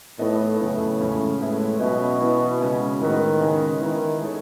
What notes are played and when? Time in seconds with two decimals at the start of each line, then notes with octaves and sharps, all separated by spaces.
0.19 A2 E3 B3 D#4 A4 D#5
0.60 F#2 A2 C#3 E3 B3 E4
0.99 E2 C#3 G#3 C#4
1.39 A2 G#3 B3 E4
1.80 B2 F#3 C#4 E4 B4 D#5
2.20 E3 B3 E4
2.61 C#3 G#3 C#4
3.00 A2 D#3 G#3 B3 F#4 B4
3.40 C#3 G#3 C#4 G#4 B4
3.81 D#3 E3 B3 E4
4.21 G#3 D#4 A4 C#5